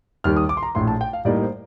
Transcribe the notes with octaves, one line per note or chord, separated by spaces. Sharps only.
D#2 D#3 G3 F6
D#6
D6
C6
A#5
A#1 A2 A3 C6
A5
G5
F5
A2 G3 A#3 D#4 D5
C5